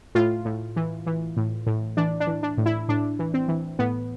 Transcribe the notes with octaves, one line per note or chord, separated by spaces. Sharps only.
A2 F4
A2
E3
E3
A2
A2
E3 D4
D4
E3
D4
A2
E4
A2 D4
E3
C4
E3
A2 B3